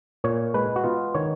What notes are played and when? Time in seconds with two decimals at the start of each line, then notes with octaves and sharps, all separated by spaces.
0.24 A#2 C#5
0.54 G#3 B4
0.76 F#4
0.84 B3 F4
1.14 D#3 C#5